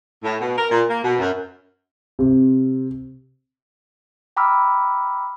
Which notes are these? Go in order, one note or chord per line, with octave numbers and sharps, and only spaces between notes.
A2
B2
A#4
A#2
A#3
B2
F#2
C3
G5 A#5 B5 D6 E6 F6